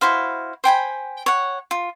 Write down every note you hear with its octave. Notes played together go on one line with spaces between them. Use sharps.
E4 F#4 C5 F5
C5 G5 G#5 B5
C#5 F#5
F4